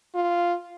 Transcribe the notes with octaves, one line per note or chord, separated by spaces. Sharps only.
F4